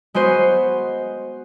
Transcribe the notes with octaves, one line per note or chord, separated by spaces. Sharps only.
G#3 B3 F#4 C5 D#7